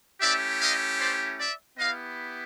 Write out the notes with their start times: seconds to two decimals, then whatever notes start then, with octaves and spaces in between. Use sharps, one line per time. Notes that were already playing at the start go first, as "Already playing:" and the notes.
0.21 A3 C#4 E4 G4 D5 E5
0.60 D#5 F5
0.99 C5 D5
1.38 D5 E5
1.78 B3 E4 G4 D#5 F5